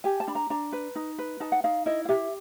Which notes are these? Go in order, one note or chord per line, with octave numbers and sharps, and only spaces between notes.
G4 G#5
A5
D4 B5
A#5
D4 A#5
B4
D#4
B4
D#4 A5
F#5
D#4 F5
E4 D#5
F5
G4 E5